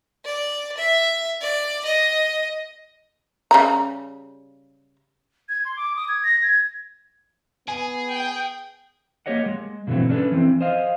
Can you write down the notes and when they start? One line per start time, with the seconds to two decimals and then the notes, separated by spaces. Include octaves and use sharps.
0.25 D5
0.78 E5
1.41 D5
1.85 D#5
3.51 C#3 G3 A#5
5.49 G#6
5.65 C6
5.76 D6
5.96 D#6
6.08 G#6
6.24 A#6
6.42 G#6
7.68 B3 G#4 G#5
8.11 G5
9.26 A#3 B3 G4 C#5 D#5 F#5
9.46 G#3
9.87 G2 B2 D3 E3 A3 C4
10.09 C#4 D4 G4 A4 B4
10.31 E3 C4
10.61 C5 D#5 F5